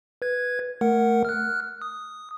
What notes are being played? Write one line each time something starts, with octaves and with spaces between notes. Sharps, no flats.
B4 G#6
A3 A#4 F#5
F6 F#6
D#6